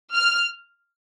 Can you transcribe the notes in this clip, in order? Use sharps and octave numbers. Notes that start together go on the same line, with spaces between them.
F6